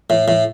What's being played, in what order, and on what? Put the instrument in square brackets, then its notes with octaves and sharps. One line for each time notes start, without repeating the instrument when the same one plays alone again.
[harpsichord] A2
A2